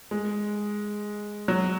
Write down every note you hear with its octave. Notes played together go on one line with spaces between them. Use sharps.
G#3
F#3